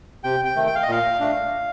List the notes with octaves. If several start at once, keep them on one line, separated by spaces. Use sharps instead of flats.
C3 G5
G5
D#3 A3
G5
F5
D#5
A#2 F5
A3 D4